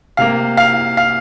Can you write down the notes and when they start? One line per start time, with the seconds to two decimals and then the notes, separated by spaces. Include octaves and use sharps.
0.17 C3 A#3 F5
0.57 F5
0.97 F5